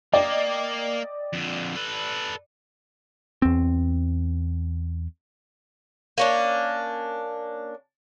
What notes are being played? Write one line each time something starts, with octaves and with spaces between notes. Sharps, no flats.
A#3 D5 D#5 G5
F2 D3
A4 B4
E2 C4
A#3 C#4 D4